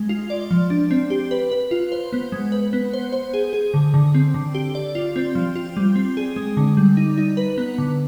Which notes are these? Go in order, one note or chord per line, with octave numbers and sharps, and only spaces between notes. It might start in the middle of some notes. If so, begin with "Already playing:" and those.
Already playing: G#3
F4
D5
F3
D4
C4
G4
B4
B4
F4
C5
B3
G#3
B4
B3
C5
C5
G#4
G#4
D3
D3
C4
D3
G4
D5
F4
C4
F3
F4
G3
C4
G#4
G#3
D3
G3
D#4
D#4
B4
B3
D3